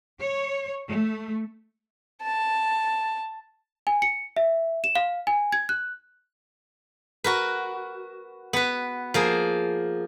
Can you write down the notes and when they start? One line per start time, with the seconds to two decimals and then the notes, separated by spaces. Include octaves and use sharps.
0.19 C#5
0.88 A3
2.22 A5
3.87 G#5
4.02 C#7
4.36 E5
4.84 E7
4.95 F5
5.27 G#5
5.52 G#6
5.69 F#6
7.24 F#4 A#4 B4
8.53 B3 B4
9.14 F3 A#3 G#4